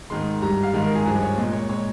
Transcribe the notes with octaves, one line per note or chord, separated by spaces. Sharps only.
G#2 D#3 G#3 C6
G2 G3 A#5
F5
G#2 D#3 G#3 F5
A#4
G#4
G2 F3 G#3 G#4
C#5
A#2 G#3 D#5
C#5
A#2 G#3 C#5